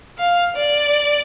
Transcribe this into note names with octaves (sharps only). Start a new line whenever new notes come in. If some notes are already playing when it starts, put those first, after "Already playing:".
F5
D5